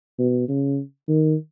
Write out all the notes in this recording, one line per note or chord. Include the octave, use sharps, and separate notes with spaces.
B2
C#3
D#3